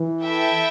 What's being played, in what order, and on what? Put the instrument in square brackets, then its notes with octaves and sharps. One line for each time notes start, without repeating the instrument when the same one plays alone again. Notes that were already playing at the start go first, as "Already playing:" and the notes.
Already playing: [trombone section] E3
[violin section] E4 A4 E5 G5